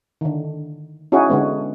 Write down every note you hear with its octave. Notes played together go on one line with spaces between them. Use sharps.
D3 D#3
C#4 D#4 E4 F#4 G#4
D3 G#3 B3